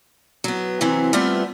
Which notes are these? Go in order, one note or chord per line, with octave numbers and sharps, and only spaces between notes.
F#3 B3
C3 E3 F#3 B3 C4
G3 A3 B3 C4 F4 E5